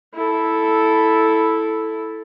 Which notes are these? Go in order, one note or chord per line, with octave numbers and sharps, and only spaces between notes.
E4 A4